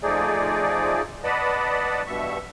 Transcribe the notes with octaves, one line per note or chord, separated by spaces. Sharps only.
F3 A3 D#4 G#4 D5
B4 D5 D#5 F#5 A5 B5
G2 B2 E5 C#6